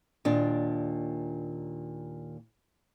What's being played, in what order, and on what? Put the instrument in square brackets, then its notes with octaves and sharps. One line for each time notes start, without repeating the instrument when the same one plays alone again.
[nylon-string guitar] D#2 A#2 D4